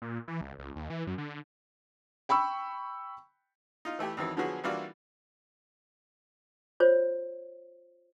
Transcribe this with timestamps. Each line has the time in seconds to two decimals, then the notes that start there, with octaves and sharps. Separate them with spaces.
0.02 A#2
0.28 E3
0.41 C#2
0.59 C#2
0.76 D#2
0.90 E3
1.07 F#2
1.18 D3
2.29 G5 B5 C#6 E6
3.85 D#4 F4
3.99 E3 A3 E4 G4
4.17 F2 D#3 E3 F#3
4.37 D3 F3 F#3 B3 F#4 G#4
4.64 E3 G3 A#3 D4 F4 F#4
6.80 F4 C5 C#5